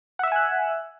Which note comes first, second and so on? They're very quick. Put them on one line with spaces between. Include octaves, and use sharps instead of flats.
F#5 E5 E6 G#5 F#6